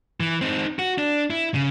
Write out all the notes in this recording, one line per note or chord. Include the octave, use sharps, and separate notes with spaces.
E3
C4 D#4
F#4
D4
E4
C#3